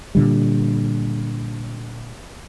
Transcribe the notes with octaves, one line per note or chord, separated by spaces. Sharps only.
A#2 D3 G3